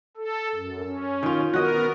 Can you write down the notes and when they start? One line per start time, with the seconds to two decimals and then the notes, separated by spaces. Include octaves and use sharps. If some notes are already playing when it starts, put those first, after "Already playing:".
0.17 A4
0.55 F#2
0.84 C#4
1.23 D#3 F4
1.53 B3 F#4 A#4 D#5